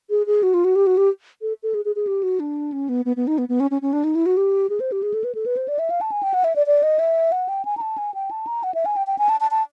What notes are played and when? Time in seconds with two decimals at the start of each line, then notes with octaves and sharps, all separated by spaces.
0.10 G#4
0.27 G#4
0.43 F#4
0.54 F4
0.65 F#4
0.76 G4
0.87 F#4
0.97 G4
1.42 A4
1.63 A4
1.74 G#4
1.85 G#4
1.96 G#4
2.07 G4
2.23 F#4
2.40 D4
2.72 C#4
2.89 B3
3.05 B3
3.17 B3
3.27 D#4
3.38 B3
3.49 B3
3.60 C#4
3.71 C#4
3.82 C#4
3.93 D4
4.04 D#4
4.15 E4
4.26 F#4
4.37 G4
4.70 G#4
4.80 C5
4.92 G4
5.03 G#4
5.14 A4
5.24 B4
5.35 A4
5.46 B4
5.57 C5
5.68 D5
5.79 E5
5.90 F5
6.01 A5
6.12 G#5
6.23 G5
6.34 F#5
6.44 E5
6.56 D5
6.67 D5
6.83 D#5
6.99 E5
7.32 F#5
7.49 G5
7.65 G#5
7.77 A#5
7.81 A5
7.98 G#5
8.14 G5
8.31 A5
8.47 A#5
8.64 F#5
8.74 E5
8.86 G#5
8.97 G5
9.07 G5
9.18 G#5
9.29 A5
9.40 A5
9.51 A5